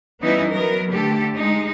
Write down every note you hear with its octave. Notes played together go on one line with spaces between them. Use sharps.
E3 G3 B3 C#4 D#4 E4
F#3 B3 A#4
D3 A3 G4 A4
G#3 D#4